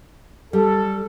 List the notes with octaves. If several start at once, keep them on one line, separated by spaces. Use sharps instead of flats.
G3 A4